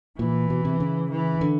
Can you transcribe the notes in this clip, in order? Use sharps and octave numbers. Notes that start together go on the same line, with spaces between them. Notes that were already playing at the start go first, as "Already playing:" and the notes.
A#2 E3
B2
C3
C#3
E3
D3